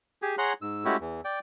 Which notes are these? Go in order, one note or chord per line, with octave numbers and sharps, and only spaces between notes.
G4 G#4 G#5
G#4 C#5 F#5 A#5 C6 F#6
G#2 E6
G#3 A3 C#4 E4 F#4 G4
E2 E3
D5 G5